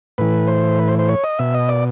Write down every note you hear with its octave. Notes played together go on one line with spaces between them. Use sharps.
A2 E3 B4
C5
B4
C5
C5
C#5
D#5
B2 E5
D#5
D5